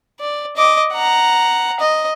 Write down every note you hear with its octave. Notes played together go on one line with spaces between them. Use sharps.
D5
D#5 D6
F#5 A#5
D#5